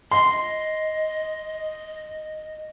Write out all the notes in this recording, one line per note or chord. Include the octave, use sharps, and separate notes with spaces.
D#5 C6